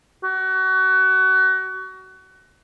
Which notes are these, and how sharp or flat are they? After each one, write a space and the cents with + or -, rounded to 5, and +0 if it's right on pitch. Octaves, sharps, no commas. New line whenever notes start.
F#4 +25